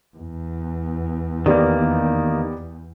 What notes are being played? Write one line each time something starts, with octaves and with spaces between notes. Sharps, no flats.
E2
D#3 A#3 B3 G4 D5